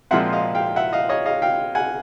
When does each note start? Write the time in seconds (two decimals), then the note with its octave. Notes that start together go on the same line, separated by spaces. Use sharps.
0.11 A#2 F3 G#3 C4 E5 F#5
0.33 D#5 F5
0.55 F5 G5
0.76 E5 F#5
0.93 D#5 F5
1.09 C#5 D#5
1.26 D#5 F5
1.42 F5 G5
1.75 F#5 G#5